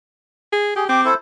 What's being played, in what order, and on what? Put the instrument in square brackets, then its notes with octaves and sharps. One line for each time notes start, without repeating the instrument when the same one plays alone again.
[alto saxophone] G#4
[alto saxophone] G4 [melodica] G#4
[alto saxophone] C4 [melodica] G4 D6
[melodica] E4 A4 C5